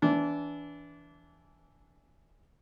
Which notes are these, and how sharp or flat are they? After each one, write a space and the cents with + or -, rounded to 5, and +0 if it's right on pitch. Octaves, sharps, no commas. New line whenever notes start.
E3 +0 D4 -25